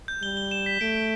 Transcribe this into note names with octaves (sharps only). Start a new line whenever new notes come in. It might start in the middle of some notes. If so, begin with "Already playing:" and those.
G6
G3 G7
G7
E7
B6
A3 D7
D7